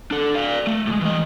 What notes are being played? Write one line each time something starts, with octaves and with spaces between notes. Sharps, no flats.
D4 A4
D5 F5
A3
A2 G#3
E3 D#5